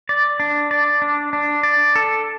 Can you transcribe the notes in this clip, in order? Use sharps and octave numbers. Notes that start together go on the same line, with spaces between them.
D5
D4
D5
D4
D4
D5
A4